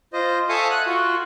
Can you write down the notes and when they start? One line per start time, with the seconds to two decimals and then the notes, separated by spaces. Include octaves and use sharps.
0.13 F4 C5 D#5
0.49 A4 E5 F5 G#5 C#6 D#6
0.70 F#5 F#6
0.86 F4 F#4